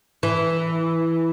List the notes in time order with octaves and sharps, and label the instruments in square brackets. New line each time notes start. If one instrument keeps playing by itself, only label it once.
[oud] E3